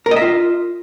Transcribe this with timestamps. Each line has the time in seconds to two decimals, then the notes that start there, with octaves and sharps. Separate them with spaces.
0.06 A#4
0.11 D#5
0.16 E5
0.22 F4